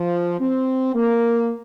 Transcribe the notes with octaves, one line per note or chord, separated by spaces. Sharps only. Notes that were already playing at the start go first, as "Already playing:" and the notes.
Already playing: F3
C4
A#3